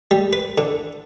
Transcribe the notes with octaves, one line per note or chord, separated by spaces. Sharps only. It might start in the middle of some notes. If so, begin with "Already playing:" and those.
G3
B4
D3